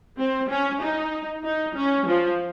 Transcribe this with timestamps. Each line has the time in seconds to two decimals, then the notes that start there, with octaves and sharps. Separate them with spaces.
0.18 C4
0.49 C#4
0.81 D#4
1.44 D#4
1.75 C#4
2.06 F3